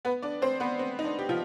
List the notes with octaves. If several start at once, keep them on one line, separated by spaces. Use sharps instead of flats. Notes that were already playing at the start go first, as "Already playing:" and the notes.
B3 B4
D4 D5
C4 C5
B3 B4
C4
D#4
D4
G4
F3 F4